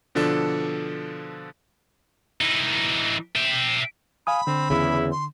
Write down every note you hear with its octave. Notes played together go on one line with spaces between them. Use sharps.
B2 D3 F3 D4 A4
E3 D#4
E5 G5
F5 G#5 B5 D#6
D3 C4
E2 C#3 E4
C6